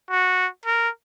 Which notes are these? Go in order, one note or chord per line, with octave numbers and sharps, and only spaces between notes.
F#4
A#4